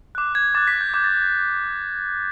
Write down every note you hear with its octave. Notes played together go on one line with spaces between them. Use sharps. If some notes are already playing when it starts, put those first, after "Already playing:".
D6 F#6
G#6
D6 F#6 A6
B6
G6
D6 G6 G#6
A6